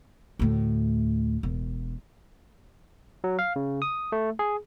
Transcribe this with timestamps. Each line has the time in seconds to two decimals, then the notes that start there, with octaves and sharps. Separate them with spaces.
0.39 D2 A2
1.43 E1
3.24 F#3
3.39 F5
3.56 C#3
3.82 D#6
4.12 A3
4.39 G#4